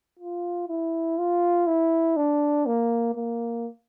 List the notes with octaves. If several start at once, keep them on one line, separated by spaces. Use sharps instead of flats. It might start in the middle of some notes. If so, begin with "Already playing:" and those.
F4
E4
F4
E4
D4
A#3
A#3